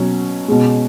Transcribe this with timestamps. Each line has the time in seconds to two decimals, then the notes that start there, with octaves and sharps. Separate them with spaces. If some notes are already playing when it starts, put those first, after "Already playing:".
Already playing: B2 F#3 C#4
0.48 B2 G#3